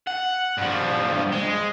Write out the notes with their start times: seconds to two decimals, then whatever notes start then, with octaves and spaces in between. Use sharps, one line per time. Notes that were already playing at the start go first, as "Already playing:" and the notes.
0.07 F#5
0.58 G2 F3
1.32 G#3